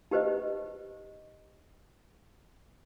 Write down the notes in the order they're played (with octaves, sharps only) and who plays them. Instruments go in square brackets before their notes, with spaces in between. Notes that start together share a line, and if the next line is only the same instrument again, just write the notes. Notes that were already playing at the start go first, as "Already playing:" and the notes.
[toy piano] D#4 G4 B4 C5 D#5